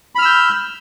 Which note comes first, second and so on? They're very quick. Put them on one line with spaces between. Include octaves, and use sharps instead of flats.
B5 F6 E6 G6